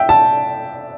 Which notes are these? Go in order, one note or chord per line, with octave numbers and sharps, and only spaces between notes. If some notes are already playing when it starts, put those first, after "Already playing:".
Already playing: E5 G5
A5